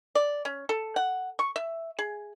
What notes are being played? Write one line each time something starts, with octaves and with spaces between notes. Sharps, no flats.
D5
C#4
A4
F#5
C#6
E5
G#4